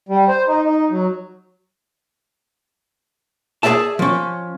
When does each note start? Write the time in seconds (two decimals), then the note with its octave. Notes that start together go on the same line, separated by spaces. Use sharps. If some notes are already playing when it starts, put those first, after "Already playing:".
0.09 G3
0.28 C5
0.48 D#4
0.64 D#4
0.90 F#3
3.63 G#4 C5 D5 E5 A5
3.99 F3 C#4